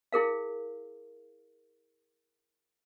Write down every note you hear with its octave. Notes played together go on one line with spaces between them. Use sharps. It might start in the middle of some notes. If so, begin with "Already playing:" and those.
E4 G#4 A#4 F5